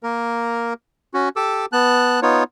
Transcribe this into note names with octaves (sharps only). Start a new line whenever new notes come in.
A#3 A#4
C#4 F#4
G4 A4 D6 E6
B3 A5 F#6
B3 D#4 F4 C#5